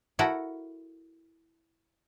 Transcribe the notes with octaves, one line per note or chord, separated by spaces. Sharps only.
E4 F#4 A4 A#4 F#5